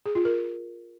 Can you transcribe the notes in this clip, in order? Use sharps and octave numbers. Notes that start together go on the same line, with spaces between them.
G#4
F4
A#4